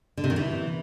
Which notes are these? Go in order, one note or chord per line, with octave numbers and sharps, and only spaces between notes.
D3
C3
D#3
E3